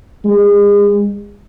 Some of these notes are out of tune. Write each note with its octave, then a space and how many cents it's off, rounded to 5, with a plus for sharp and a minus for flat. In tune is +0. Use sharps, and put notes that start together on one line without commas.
G#3 -35